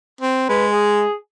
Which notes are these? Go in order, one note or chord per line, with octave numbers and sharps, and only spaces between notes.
C4
G#3 B4
G#4